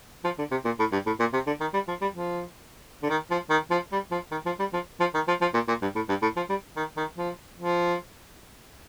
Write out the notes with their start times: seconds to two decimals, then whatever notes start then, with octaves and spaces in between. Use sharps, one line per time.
0.24 F3
0.39 D3
0.51 C3
0.65 A#2
0.79 A2
0.92 G2
1.06 A2
1.20 A#2
1.33 C3
1.47 D3
1.60 D#3
1.74 G3
1.88 F3
2.01 G3
2.14 F3
3.03 D3
3.10 D#3
3.31 F3
3.50 D#3
3.71 F3
3.92 G3
4.11 F3
4.32 D#3
4.46 F3
4.59 G3
4.73 F3
5.00 F3
5.14 D#3
5.28 F3
5.41 F3
5.54 A#2
5.68 A#2
5.82 G2
5.95 A2
6.09 G2
6.22 A2
6.37 F3
6.49 G3
6.76 D#3
6.97 D#3
7.17 F3
7.58 F3